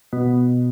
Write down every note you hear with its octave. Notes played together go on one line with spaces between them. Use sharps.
B2